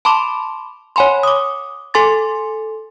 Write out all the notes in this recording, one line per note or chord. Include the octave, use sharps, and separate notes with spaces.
A5 B5 C6 D6
C#5 F#5 G#5 B5 C6
D6 D#6
A4 G#5 C6 D6 A6